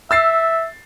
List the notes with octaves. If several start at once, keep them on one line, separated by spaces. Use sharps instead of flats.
E5 E6 A6 C7